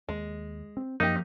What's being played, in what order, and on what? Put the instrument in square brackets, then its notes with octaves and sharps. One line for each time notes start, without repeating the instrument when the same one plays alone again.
[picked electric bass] D#2 [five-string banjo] G#3
[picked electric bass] C4
[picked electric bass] F#2 [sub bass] F3 [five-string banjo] A#3 G4 [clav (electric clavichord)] D#4